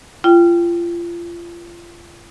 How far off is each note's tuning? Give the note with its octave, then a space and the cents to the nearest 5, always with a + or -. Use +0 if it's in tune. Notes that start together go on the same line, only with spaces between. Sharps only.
F4 -30 G5 +0